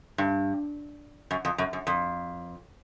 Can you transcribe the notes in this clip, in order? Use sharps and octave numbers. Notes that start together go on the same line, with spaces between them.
G2
F#2
F2
F#2
F#2
F2